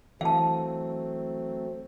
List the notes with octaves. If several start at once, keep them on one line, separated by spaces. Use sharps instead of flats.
E3 F#3 A3 C4 F5 A5